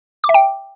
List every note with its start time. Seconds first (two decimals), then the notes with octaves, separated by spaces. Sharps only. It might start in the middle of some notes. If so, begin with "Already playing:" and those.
0.24 D6
0.29 E5
0.34 G5